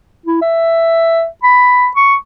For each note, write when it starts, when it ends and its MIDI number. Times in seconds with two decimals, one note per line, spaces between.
0.26 0.39 64
0.41 1.26 76
1.43 1.88 83
1.96 2.15 85